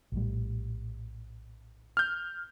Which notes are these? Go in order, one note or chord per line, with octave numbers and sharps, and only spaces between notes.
A#1 A2 G3
F6 G6